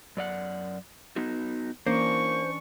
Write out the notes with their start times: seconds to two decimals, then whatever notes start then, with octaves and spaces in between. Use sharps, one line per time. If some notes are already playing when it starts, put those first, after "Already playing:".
0.17 F#2 D5 F#5
1.16 B3 D#4 F#4
1.87 E3 A#3 C#4 D4 C5 C#6